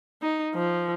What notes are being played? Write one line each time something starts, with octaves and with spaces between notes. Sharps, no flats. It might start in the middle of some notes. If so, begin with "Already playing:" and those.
D#4
F3